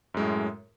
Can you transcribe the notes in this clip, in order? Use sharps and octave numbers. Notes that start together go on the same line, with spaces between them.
F#2 A2 G#3